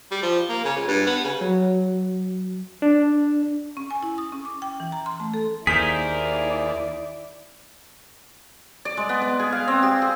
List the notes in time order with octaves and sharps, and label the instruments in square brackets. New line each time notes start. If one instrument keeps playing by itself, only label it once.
[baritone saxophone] G3
F3
A#3
C#3
C#2
G2
B3
C#3
[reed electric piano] F#3
D4
[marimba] C#4
G#5
E4
D#6
C#4
D6
G5
E3
A#5
C6
A3
A4
[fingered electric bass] D#2 [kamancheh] E4 D5 [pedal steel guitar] G#4 A#4 C5 [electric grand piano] B6
[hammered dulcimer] D5
G#3
B3
B3
G#4
F5
C4
G4
G#4